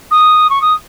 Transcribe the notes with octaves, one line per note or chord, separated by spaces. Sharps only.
D#6
C#6
D#6